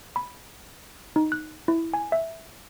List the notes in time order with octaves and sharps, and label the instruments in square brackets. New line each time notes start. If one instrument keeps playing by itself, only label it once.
[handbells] B5
D#4
F#6
E4
G#5
E5